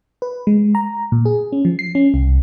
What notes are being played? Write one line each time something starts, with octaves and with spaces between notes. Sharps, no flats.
B4
G#3
A#5
A#2
G#4
C#4
F3
C7
C#4
C2